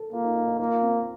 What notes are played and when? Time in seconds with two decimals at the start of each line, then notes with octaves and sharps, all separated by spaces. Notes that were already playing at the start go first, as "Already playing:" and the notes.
Already playing: A4 A#4
0.13 A#3 F4
0.24 D#4
0.36 D#4
0.48 D#4
0.59 A#3 F4
0.82 C4